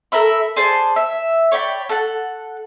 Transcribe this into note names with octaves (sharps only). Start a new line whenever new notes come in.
A4 A#4 E5 B5
G#4 C5 D5 A5
E5
C#5 D5 G5 B5
A4 F#5